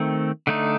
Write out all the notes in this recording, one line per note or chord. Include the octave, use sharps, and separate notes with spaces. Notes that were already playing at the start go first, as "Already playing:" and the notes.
Already playing: D#3 A3 C4
D3 A3 D#4